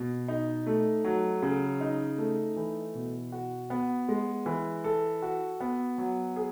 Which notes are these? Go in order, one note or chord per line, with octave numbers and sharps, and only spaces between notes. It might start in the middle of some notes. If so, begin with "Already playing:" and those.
Already playing: B2
D#4
A3
F#3
C#3
D#4
A3
E3
B2
F#4
B3
G#3
E3
A4
F#4
B3
F#3
G#4